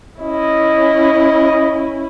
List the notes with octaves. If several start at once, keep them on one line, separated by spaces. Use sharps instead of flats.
C#4 E4 D#5